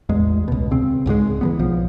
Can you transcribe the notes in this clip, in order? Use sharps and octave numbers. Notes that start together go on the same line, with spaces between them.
A1 E2 G#3
C#2 B2
C#3 C4
C#2 G#2 F3 G#3
E3 F#3 B3
B1 F3